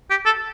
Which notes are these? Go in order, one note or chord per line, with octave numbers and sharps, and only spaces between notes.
G4
A4